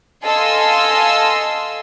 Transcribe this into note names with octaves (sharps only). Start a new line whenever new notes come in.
A4 D#5 F5 G#5 C6 E6